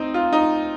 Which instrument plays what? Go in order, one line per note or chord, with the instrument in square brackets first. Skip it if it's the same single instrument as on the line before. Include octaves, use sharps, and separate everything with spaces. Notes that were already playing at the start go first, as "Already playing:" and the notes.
Already playing: [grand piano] C4 D#4
F4
D#4